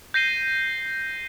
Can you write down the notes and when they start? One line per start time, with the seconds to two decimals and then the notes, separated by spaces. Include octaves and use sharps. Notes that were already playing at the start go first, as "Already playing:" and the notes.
0.14 G6 A#6 C7 D#7 G7